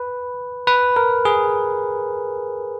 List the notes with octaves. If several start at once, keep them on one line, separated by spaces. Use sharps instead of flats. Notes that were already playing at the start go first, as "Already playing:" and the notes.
Already playing: B4
B4
A#4
G#4